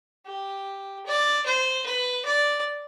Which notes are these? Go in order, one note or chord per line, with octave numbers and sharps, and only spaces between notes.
G4
D5
C5
B4
D5